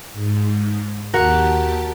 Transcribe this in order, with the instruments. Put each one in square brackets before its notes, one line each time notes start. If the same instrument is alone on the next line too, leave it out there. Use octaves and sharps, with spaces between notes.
[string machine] G#2
[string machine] D#2 G4 A5 [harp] F#4 A#4 F#5